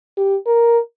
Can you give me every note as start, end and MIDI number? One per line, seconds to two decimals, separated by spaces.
0.17 0.36 67
0.46 0.79 70